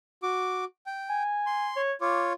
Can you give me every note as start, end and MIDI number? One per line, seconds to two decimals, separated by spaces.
0.23 0.64 66
0.23 0.64 86
0.86 1.23 79
1.09 1.69 80
1.46 1.81 84
1.76 1.92 73
2.01 2.33 65
2.01 2.33 73
2.01 2.22 86